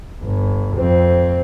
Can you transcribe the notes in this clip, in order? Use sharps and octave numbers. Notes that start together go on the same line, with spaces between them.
G1
F2 C4